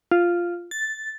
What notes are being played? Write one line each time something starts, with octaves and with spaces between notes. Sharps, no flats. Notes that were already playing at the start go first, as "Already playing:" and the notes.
F4
A6